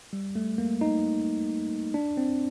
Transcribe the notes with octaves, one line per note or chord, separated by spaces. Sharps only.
G3
A3
A#3
D#4
D4
C4